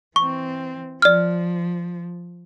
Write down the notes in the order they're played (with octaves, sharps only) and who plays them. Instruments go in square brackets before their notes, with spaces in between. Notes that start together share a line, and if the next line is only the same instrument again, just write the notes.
[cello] E3 C4 [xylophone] C#6
[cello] F3 [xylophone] D5 F6